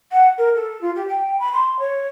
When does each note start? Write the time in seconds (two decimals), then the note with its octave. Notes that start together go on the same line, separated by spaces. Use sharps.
0.11 F#5
0.37 A#4
0.55 A4
0.81 F4
0.95 G4
1.08 G5
1.39 B5
1.53 C6
1.79 C#5